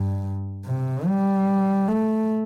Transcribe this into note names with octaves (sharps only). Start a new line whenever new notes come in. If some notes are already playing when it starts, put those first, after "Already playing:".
Already playing: G2
C3
G3
A3